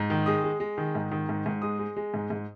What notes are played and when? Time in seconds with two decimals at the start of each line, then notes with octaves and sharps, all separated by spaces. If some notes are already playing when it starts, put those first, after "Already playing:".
Already playing: G#2
0.10 D#3
0.26 G#3 D#6
0.44 G#3
0.60 G#3
0.78 D#3
0.95 G#2
1.11 D#3
1.29 G#2
1.46 G#2
1.62 G#3 D#6
1.79 G#3
1.97 G#3
2.14 G#2
2.30 G#2